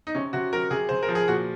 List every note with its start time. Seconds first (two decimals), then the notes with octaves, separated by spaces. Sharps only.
0.07 D#4
0.15 C3 C#4
0.33 C3 F#4
0.53 F#3 A#4
0.71 C3 G#4
0.89 C3 C5
1.03 A#4
1.09 F3
1.15 G#4
1.28 A#2 F#4